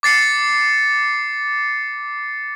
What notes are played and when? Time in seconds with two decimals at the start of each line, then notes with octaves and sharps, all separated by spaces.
0.03 D6 A6 C7 C#7